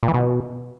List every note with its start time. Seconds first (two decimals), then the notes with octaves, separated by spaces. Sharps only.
0.03 A#2
0.08 E3
0.14 B2